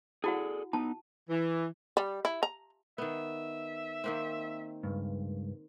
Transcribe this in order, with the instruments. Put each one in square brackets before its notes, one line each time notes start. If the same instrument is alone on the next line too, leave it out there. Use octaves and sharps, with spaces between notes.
[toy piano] E4 F#4 F#5 [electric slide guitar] G#4 A4 D5
[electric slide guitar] B3 D#4 [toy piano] A5
[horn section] E3
[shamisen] G3
E4
A#5
[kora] D#3 B3 [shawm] E5
[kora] D#3 A#3 C4
[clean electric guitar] C#2 G2